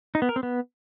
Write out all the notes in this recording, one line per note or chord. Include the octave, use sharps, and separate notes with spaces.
D#4
B3
A#4
C4
B3